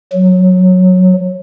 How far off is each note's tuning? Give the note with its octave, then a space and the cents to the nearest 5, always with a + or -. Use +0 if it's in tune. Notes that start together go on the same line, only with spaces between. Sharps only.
F#3 -10